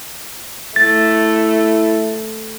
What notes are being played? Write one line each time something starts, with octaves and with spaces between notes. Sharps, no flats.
A3 E4 A6